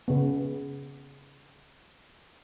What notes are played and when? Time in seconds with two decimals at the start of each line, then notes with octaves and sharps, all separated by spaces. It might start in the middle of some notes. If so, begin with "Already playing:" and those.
0.08 C#3 B3